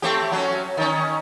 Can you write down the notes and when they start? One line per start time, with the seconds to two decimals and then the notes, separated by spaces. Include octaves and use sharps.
0.02 A3 C4 G4
0.32 F#3 C#4
0.77 D#3 C#4